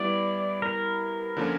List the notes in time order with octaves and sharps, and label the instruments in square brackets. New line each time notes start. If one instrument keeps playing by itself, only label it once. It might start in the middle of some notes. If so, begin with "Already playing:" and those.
Already playing: [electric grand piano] G3 B3 E4 [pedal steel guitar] D5
[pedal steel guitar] A#4
[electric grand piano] D3 F3 A#3 C#4